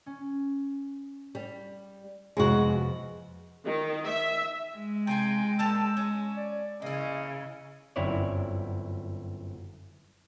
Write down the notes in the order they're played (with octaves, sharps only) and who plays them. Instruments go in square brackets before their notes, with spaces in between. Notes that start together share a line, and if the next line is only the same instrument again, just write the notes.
[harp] C#4
[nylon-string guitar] G3
[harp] F2 C3 B3 [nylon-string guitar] G#3 F#4
[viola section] D#3
E5
[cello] G#3
[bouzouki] C3 F4 G#5 [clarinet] G5
[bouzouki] A#2 G4 A5 [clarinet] E6
[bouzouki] C#4
[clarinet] D5
[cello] C#3 [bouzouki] A#3 E4 [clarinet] D#5
[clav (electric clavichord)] G1 F#2 C4 E4 C#5 D5